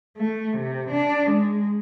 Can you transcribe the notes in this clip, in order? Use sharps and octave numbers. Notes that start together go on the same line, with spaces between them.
A3
C3
D4
G#3